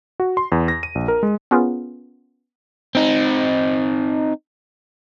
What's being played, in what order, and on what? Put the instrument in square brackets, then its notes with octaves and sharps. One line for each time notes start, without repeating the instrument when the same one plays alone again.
[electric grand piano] F#4
C6
E2
A#6
D#7
A#1
A#4
G#3
[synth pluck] B3 C#4 F4 G#4 A#4 B4
[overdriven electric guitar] C4 D#4